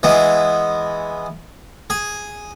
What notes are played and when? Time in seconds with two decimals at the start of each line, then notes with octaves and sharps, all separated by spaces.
0.03 E3 G#3 B3
1.90 G#4